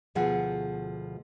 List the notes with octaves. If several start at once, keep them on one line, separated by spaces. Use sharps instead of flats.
D2 B2 F3 G#4 F#5